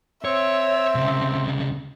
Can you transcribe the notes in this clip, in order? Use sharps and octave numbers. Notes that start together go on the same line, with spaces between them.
C4 C#5 E5
C2 C#3